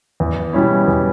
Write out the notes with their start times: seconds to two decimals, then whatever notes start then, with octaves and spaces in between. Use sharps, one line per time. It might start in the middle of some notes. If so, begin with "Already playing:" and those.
0.20 E2
0.53 B2 G3 C#4 E4
0.87 E2